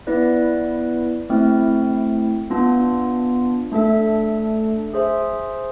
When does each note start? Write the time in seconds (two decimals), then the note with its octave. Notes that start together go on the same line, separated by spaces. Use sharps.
0.07 B3 E4 B4 D5
1.29 A3 C4 E4
2.50 B3 D4 F4
3.71 A3 D4 A4 E5
4.94 G#4 C5 E5